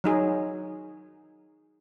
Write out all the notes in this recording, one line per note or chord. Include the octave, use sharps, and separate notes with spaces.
F#3 D#4 G#4